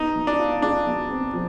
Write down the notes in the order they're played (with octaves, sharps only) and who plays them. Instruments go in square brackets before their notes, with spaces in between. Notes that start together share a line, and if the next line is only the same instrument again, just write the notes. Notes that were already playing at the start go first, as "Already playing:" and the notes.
Already playing: [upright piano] B3 [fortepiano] D#4
[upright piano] B2
[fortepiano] D4
[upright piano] F4
[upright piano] G#3 [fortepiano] D4
[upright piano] B2
C4
F3